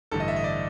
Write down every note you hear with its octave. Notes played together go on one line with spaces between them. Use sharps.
A1 G2 D3 A4
D#5
E5
D#5
D5